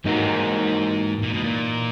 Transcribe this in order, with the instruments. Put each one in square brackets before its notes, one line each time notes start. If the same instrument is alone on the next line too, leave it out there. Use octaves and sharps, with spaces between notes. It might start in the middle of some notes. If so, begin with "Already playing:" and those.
[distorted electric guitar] G#2 [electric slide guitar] E3 A#3 D#4 F#4 A#4
[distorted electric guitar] A#2
B2
A#2